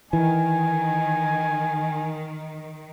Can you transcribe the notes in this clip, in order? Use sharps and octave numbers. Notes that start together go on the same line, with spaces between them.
D#3 E3 G#5